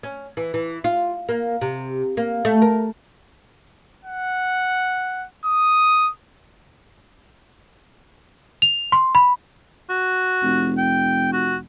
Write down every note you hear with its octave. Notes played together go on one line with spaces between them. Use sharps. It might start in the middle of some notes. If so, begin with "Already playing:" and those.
C#4
E3
E3
F4
A#3
C3
A#3
A3
A#4
F#5
D#6
F7
C6
B5
F#4
F1
G5
F#4